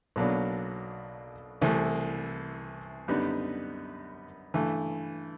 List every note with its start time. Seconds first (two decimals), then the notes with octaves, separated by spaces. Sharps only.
0.16 B1 B2 F#3 A#3 D4
1.61 C2 C3 E3 A3
3.08 F#2 D3 G3 B3 D#4
4.54 G2 E3 A3